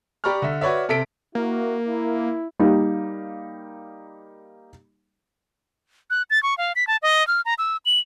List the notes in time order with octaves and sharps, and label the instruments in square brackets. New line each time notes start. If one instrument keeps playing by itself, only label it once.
[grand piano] G4 D5 A#5 B5 C#6 F6
D3 E5
F#4 B4 C#5 D5 E5
C3 A4 E5 B6 D7
[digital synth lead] A#3 [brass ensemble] E4 F#4
[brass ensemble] E4
[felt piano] G3 A#3 D#4
[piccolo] F#6
A6
C#6
F5
B6
A5
D#5
F6
A#5
E6
F#7